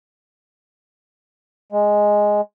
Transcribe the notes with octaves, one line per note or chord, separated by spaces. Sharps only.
G#3